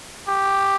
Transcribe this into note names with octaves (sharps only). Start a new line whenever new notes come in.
G4